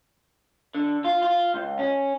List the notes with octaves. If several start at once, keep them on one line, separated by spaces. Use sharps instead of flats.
D3
F4
F4
C#2
C#4